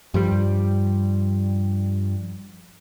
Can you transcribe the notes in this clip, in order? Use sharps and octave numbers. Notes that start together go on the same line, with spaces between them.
G2 F3 G3